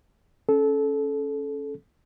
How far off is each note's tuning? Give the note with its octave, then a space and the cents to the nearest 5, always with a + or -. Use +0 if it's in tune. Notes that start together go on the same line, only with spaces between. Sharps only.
C#4 +0 A4 -20